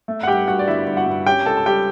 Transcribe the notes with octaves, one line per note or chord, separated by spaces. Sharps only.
A3
F#5
G2 G4 G5
G2 F#4 F#5
D5
G1 E4 E5
G1
F#4 F#5
G2
C#4 G4 G5
C#2 A4 A5
A5
G3 G4 G5